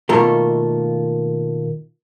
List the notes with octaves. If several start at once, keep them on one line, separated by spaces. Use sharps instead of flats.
B2 D#3 A3 A#3 F4 A4